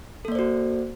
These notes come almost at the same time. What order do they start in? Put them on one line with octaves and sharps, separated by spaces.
A4 A#3 D5 C5 F#4